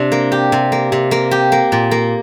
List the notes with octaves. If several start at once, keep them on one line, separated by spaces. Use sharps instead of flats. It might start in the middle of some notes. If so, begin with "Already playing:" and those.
Already playing: C3 D4
A#3
G4
C3
A#3
C3
A#3
G4
A#3
A#2
A#3